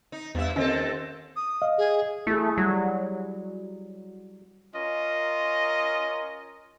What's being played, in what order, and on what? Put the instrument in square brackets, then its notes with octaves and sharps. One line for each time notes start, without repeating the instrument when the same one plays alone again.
[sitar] D#4
[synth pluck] E2 [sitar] G2 E5
[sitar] D#2 C4 A4 [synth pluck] C#4 D#5
[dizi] D#6
[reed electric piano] D#5 F5
[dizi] G#4
[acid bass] A3 [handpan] E4 G#4
[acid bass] F#3 [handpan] G3 F#4
[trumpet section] C#4 F4 A#4 D#5